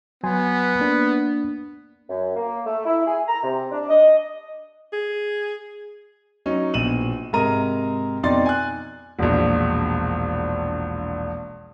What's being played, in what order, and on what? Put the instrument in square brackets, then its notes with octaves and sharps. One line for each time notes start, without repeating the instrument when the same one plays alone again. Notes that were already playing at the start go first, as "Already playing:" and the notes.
[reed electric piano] F#3 G#5 C6 [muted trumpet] B3
[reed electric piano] A#3 D4
[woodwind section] F#2
A#3
A3
E4
G#4
A#5
C3
D4
D#5
[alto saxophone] G#4
[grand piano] F#3 C#4 D#4
A#1 B2 D#7 E7 F#7
G#2 C3 A#4 A#5 D#7
F2 B2 D#4 D5 C6 A6
G#5 F#6
E1 A#1